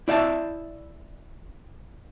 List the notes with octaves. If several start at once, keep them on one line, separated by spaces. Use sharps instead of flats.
E4 D5 E5 F5 A5